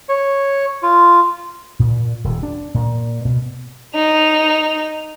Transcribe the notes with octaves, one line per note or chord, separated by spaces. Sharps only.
C#5
F4
A#2
D#1
D4
A#2
B2
D#4 F7